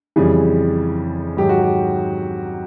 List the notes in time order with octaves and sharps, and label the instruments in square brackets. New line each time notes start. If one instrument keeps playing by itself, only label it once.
[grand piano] F2 C#3 E3 G3 G#4
G#2 D#3 F#3 G4
F#4
G4